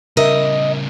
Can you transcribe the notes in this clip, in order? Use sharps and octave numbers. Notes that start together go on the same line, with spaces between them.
C#3 G3 A#4 D#5 E5